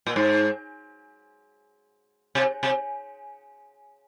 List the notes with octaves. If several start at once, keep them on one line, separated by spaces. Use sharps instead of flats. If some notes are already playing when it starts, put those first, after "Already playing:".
A#2
G#2
C3
C3